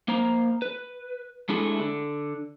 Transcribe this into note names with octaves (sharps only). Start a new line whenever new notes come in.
A#3 C5 A#5
B4
G#3 A3 D4 E4 G#4 A4
D3